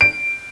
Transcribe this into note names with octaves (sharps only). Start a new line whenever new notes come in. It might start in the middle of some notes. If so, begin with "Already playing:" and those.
D7